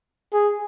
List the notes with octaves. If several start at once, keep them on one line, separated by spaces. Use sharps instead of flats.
G#4